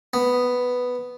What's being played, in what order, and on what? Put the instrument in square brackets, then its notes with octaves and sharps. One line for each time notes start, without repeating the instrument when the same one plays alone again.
[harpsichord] B3